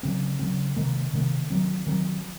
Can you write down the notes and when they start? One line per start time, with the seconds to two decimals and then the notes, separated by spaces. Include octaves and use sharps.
0.03 C#3 F#3 C4
0.39 C#3 F#3 C4
0.76 C3 D#3 A#3
1.13 C3 D#3 A#3
1.50 D#3 F#3 C4
1.87 D#3 F#3 C4